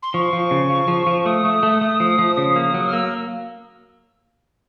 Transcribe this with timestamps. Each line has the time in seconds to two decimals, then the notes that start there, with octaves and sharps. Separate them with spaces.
0.02 C6
0.14 F3 C#6
0.33 F3
0.51 C#3
0.70 F3
0.88 F3
1.07 F3
1.25 A3 D#6
1.45 A3
1.63 A3
1.81 A3
2.00 F3
2.19 F3
2.37 C#3
2.56 A#3
2.74 F#3
2.88 F6
2.93 A#3 E6